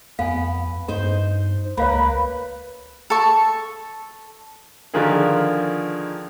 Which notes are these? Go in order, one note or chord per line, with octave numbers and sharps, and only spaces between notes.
F2 B3 F5 G#5
G2 D#4 C5
C#2 A#3 B4 C#5 F5 B5
A4 C#6
D3 D#3 F3 F4 G#4 A#4